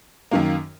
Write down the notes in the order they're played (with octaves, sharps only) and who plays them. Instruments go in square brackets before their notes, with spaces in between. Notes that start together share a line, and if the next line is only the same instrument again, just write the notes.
[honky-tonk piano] F#2 D#3 A#3